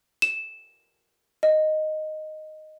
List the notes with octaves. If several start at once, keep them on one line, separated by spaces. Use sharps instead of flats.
E7
D#5